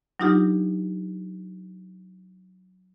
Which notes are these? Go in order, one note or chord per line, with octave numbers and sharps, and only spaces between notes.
F#3 D4 D#4 F4 G4